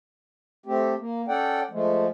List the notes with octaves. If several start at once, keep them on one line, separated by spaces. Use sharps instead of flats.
A3 C4 G4
A#3
C#4 A4 D5 F#5 G5
F3 G#3 A3